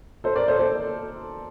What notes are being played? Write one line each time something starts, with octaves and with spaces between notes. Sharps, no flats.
A4 C5
A#4 D5
A4 C5
A4 C5